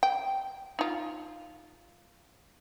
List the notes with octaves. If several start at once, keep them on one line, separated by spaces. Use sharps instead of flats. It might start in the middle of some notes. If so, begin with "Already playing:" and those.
G5
D#4 F4